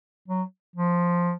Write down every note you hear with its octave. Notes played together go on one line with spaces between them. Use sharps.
F#3
F3